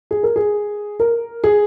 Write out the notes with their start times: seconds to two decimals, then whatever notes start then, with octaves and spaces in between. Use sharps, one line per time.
0.11 G#4
0.23 A#4
0.36 G#4
1.00 A#4
1.44 G#4